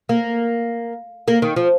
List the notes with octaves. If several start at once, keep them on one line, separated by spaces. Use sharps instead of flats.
A#3
A#3
D#3
F3